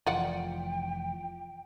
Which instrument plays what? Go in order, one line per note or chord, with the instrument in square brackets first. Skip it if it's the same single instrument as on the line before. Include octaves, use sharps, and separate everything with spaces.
[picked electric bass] F1 E3 F3 [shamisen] F4 D5 F#5 [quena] G5